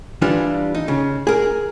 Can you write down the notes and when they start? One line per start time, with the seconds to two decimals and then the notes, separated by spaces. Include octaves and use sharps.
0.22 E3 G3 D4 F4
0.75 D#4
0.88 C#3
1.27 G#4 A#4